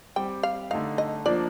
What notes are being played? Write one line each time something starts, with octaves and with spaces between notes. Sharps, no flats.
G3 C4 G4 G5
F5
D3 A3 D#4 F5
D#5
F3 A#3 D4 D5